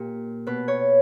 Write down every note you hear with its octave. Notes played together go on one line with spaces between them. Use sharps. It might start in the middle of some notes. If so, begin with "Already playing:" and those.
Already playing: A#2 G4
B2 B4
C#5